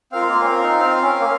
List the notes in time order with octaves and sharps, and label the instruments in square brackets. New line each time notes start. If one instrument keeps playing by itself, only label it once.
[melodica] C4 [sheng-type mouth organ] F4 A#4 F5
[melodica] G#3
A#3
C#4
C4
D#4
C4
C#4
A#3